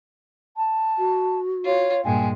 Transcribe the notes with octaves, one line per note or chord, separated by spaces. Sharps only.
A5
F#4
F4 C#5
G2 A#2 G#3 G5 G#5